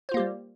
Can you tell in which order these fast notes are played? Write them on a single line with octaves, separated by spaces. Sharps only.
C5 F4 A#3 G4 G3